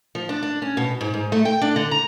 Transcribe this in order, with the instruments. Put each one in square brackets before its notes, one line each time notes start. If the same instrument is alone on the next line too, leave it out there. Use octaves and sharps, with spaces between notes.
[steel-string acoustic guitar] F3
D4
D4
C#4
B2
G#2
G#2
A3
G5
D4
D3
A#5